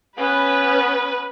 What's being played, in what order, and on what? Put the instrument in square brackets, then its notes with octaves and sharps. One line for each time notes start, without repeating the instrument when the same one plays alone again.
[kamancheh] B3 C#4 [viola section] B4